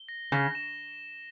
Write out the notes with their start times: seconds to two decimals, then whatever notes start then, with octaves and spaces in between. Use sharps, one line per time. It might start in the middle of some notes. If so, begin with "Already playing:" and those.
Already playing: G7
0.09 A#6
0.32 C#3 A#6
0.55 E7